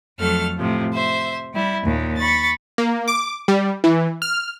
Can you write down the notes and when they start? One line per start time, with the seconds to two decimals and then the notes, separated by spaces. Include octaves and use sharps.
0.19 F2 F#3 A3 A4 F6
0.57 A2 C3 F3
0.93 C5 E5
1.53 G3 E4
1.84 D#2 A#2
2.18 B5 C#6 A6
2.78 A#3
3.08 D6
3.48 G3
3.84 E3
4.22 F6